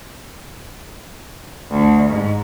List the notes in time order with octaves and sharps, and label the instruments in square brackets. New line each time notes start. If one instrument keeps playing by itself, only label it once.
[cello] D2
G#2